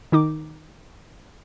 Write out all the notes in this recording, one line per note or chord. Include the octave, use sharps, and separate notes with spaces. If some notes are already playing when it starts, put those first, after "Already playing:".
D#3 D#4 D6